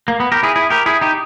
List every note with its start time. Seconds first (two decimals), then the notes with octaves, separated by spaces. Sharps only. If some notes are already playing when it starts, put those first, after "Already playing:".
0.08 A#3
0.20 B3
0.32 G4 A#4
0.43 E4 G#4
0.56 E4 G#4
0.70 G4 A#4
0.86 E4 G#4
1.01 D#4 G4